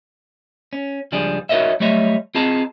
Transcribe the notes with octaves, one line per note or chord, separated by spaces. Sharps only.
C#4
C#2 F3 G3 D4 G#4
D#4 F#4 A#4 C#5 D#5 E5
F#3 G3 A3 C#5 D#5 E5
C4 F4 G#4 D#5 A5 A#5